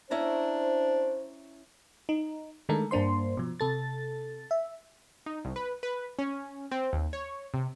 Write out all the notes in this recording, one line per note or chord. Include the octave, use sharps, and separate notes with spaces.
C#4 D4 E4 C5 A#5
D#4
D#3 G#3 A3 D4 A4 A#4
G2 A#3 D4 C5 C6
B2 F3
C3 A4 A6
E5
D#4
C2
B4
B4
C#4
C4
D#2
C#5
C3